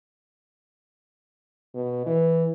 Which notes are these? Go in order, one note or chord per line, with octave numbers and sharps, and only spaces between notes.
B2
E3